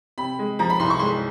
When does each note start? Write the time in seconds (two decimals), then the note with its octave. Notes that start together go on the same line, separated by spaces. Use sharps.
0.18 C3 B5
0.39 G#3
0.59 F3 A#5
0.70 B5
0.79 C2 C6
0.90 C#6
0.99 G#3 C6